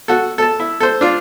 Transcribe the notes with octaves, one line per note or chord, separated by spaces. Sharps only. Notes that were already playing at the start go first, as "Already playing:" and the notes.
F#4 A4
A4 A5
E4
A4 C5
D4 F4